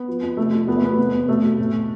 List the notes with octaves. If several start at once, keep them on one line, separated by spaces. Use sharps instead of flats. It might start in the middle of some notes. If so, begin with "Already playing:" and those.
Already playing: B3
F3
F2
C3 A3
F3
E2 B3
A3
E2 B3
F1
F1
B2 A3
B2
A2